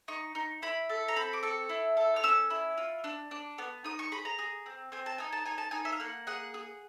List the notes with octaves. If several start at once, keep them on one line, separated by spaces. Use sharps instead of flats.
D#4 C#6
D#4
E4 B5
A4
A#5
C4 B5
D6
A4 C#6
E4
A4
F6
C#4 E6
E4
F4
D4
D4
B3
D#4 D#6
C#6
G#4 B5
A#5
G#4
C4
C4 G#5
A5
D#4 G#5
A5
D#4 G#5
A5
D#4 G#5
E5
F5
A#3 F#5
G#4 F#5
G#4